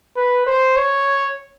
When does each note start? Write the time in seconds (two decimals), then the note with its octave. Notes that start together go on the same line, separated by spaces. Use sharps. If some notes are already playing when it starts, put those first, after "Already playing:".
0.17 B4
0.47 C5
0.76 C#5